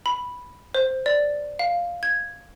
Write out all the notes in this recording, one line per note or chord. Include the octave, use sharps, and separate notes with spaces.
B5
C5
D5
F5
G#6